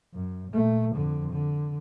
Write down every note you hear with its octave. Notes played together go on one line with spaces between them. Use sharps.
F#2
A#2 A3
F2 D3
D3